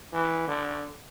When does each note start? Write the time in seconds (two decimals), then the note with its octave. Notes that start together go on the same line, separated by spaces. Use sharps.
0.13 E3
0.47 D3